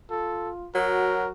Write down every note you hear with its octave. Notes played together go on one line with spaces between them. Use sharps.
F4 A4
F#3 F#4 A#4